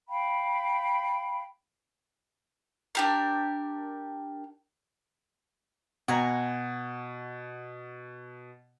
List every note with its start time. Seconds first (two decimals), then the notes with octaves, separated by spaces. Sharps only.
0.08 F5 G5 B5
2.95 D4 G4 A#4
6.08 B2 F#5 G#5 A#5